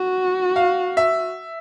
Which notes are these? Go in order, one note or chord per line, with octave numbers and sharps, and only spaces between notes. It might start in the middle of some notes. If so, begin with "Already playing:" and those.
Already playing: F#4
F5
E5